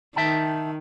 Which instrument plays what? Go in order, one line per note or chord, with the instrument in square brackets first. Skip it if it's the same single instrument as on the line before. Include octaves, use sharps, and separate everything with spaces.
[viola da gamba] D#3 [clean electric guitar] E5 G5 A5